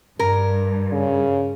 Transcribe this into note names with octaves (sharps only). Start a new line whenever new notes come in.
G2 A#4
C#3